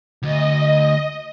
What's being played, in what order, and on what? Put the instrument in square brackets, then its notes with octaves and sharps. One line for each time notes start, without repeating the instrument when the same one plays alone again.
[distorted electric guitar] D2 [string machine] D#5